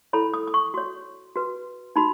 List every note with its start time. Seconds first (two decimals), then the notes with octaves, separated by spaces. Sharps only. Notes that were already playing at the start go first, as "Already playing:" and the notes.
0.13 E4 A4 C#5 B5
0.34 D#6
0.47 D#6
0.54 C#6
0.74 F#4 C#5
1.36 F#4 B4
1.96 D#4 F#4 B5